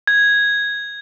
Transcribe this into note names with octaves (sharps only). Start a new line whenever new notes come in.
G#6